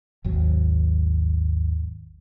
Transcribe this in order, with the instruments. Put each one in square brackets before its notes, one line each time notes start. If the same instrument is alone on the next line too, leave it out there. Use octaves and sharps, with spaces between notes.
[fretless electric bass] G#1 D#2 F#3